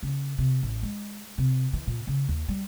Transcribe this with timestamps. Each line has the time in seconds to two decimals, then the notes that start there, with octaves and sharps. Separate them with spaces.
0.03 C#3
0.38 C3
0.63 A1
0.83 G#3
1.38 C3
1.73 E3
1.87 A#2
2.07 C#3
2.29 D#2
2.48 G3